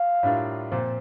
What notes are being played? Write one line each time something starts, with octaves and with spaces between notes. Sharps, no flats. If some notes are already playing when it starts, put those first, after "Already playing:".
Already playing: F5
A2 G3 D4 F4 A#4
A#2 F3 C4